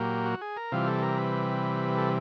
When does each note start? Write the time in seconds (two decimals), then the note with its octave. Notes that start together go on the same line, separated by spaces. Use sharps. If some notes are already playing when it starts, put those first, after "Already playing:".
Already playing: A#2 F#3 A#3 G4
0.25 F#4
0.41 G#4
0.57 A#4
0.72 C3 E3 G3 F4
0.88 A4
1.02 A#4
1.17 B4
1.97 A4